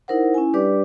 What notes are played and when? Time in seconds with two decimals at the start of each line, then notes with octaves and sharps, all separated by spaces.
0.08 D#4 E4 A#4 C5 F#5
0.34 C#4 E4 G#5
0.54 G3 D4 G4 B4 D5 D6